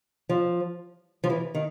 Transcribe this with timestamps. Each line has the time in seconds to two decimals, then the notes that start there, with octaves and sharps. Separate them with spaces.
0.29 F3
1.24 F3
1.30 E3
1.55 D#3